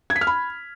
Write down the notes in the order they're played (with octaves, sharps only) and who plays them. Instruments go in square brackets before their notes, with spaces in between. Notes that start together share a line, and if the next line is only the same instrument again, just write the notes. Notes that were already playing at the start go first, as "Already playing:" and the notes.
[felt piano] G#6
B6
F6
B5